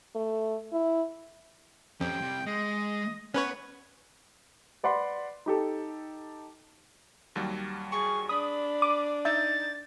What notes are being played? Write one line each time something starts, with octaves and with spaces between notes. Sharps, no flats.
A3
E4
F2 C#4 G4 G5
C3 G3
G#3 D#5
B3 C#4 B4 C#5 F#5
B4 D5 F#5 B5 C6
D#4 G4 A4
D#2 F#3 G3
G#4 C#6
D4 B5 D#6
D6 D#7
D#4 E5 G6 A6